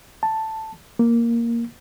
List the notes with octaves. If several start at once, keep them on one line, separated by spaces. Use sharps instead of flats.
A5
A#3